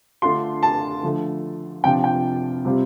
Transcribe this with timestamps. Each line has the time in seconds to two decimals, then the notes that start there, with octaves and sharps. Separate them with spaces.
0.22 D3 A3 D4 F4 C6
0.63 A5
1.03 D3 F3 A3
1.84 C3 F3 D4 F4 G5
2.04 G5
2.65 C3 G3 C4 F4